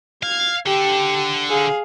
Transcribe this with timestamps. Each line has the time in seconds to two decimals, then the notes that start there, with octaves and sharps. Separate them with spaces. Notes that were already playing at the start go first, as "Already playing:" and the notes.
0.23 F5 G#6
0.66 D3 G4 A4
1.50 G#4 F5